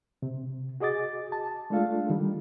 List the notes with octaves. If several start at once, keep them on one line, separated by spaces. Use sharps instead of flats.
C3
F#4 G#4 D#5 D6 A6
A5
G#3 A3 D4 F4 A4 F5
D#3 G3